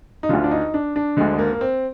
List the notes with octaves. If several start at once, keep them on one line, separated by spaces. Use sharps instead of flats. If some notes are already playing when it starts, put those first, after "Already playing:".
D#4
D2 D3 F4
D4
D#4
D4
D4
D2 D3 G#3
G#3
A#3
A#3
C4